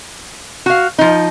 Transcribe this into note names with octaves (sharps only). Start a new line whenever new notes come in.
F#4 F5
F3 D#4